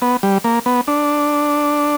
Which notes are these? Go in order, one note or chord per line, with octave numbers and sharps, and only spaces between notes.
B3
G3
A#3
B3
D4